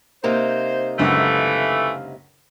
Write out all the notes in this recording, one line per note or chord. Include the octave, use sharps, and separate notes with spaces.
C3 A#3 D#4 C5
C#2 F#2 D3 E3 A3 F5